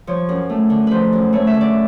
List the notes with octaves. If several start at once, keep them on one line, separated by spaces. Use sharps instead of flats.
F3 C#5
F#2
A3
D3
F3 B4 C5
F#2
A3 C#5
E5
D3
D5